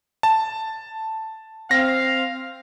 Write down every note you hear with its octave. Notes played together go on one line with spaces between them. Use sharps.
A5
C4 F5 A#6